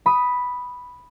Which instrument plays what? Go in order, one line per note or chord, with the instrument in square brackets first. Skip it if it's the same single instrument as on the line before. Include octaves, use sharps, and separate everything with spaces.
[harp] B5 D#6